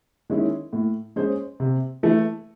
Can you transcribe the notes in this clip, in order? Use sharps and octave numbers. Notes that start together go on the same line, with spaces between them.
D#3 G#3 C#4 E4
A2
G#3 C#4 G#4 C5
C3
E3 A3